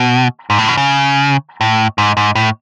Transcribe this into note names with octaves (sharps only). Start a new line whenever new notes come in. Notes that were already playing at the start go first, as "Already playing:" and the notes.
Already playing: B2
G#2
A2
B2
C#3
A2
G#2
G#2
A2